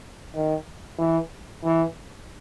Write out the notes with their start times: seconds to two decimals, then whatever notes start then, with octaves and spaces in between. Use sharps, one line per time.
0.35 D#3
0.99 E3
1.64 E3